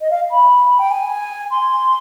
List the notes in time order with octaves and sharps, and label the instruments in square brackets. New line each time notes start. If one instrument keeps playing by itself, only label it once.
[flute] D#5
F5
B5
G5
G#5
C6